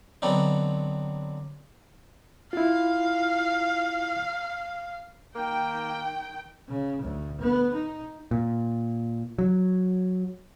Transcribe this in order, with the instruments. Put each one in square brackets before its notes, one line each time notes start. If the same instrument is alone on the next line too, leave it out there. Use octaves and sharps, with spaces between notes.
[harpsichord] D3 F#3 B3 C4 D4 D#4
[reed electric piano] E4 F4 [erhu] F5
[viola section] D#3 G5 [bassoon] A#3
[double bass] C#3
D2
B3
D#4
[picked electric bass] A#2
F#3